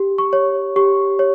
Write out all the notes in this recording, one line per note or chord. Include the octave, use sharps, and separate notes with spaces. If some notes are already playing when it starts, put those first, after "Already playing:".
Already playing: G4
C#6
C#5
G4 C#6
C#5